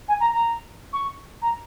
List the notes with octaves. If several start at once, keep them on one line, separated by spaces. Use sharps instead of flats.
G#5
A#5
A#5
C#6
A#5